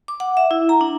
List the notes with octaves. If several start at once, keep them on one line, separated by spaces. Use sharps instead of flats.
D6
F#5
E5
E4
A#5
D4